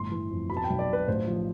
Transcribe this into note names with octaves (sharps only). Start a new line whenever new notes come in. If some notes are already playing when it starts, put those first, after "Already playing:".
Already playing: G1 A2 C6
E3
F2
B2 B5
A5
G5
B1
D5
B2 B4
A1 C5
F3